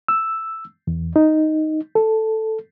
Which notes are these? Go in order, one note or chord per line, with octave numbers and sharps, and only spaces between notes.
E6
E2
D#4
A4